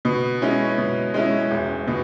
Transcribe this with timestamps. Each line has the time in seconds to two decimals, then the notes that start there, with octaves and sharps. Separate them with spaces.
0.05 B2
0.41 G#3 C#4 E4
0.78 B2
1.14 G#3 C#4 E4
1.51 E1
1.87 B2